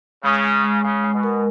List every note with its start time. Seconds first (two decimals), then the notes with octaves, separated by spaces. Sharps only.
0.23 C#3 G#3
0.44 G#3
0.64 G#3
0.84 C#3 G#3
1.04 G#3
1.14 B2
1.23 A#4